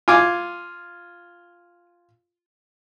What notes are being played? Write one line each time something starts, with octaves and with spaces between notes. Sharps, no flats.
F4 G#5 D6